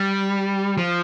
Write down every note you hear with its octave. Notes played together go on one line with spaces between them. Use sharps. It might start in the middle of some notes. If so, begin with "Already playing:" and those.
Already playing: G3
F3